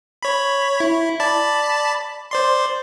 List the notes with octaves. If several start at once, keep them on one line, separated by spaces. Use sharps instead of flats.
C#5 B5
E4
D5 A5 B5
C5 D5 C6